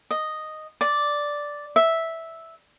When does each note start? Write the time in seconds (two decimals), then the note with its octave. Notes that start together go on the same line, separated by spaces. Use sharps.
0.11 D#5
0.81 D5
1.76 E5